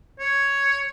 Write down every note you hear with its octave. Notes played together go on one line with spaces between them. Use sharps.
C#5